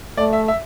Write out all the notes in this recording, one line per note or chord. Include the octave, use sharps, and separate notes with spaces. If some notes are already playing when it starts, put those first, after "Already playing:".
A3 D5
E5
E5